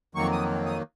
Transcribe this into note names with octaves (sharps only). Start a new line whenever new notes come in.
F2 D#3 F#3 A#3 C#6
D#6
D#6